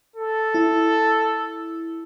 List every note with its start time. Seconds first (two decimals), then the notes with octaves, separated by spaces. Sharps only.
0.16 A4
0.54 E4